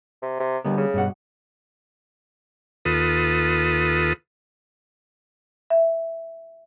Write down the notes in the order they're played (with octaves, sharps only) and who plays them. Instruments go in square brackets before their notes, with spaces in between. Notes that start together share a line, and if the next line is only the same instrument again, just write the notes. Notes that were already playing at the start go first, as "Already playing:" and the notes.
[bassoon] C3
C3
[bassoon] D#2 [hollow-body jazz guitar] D3 G3 B3
[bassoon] C#3
[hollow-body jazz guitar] G2 B2 F#5
[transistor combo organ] D#2 F4 A4 B4 D#6
[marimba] E5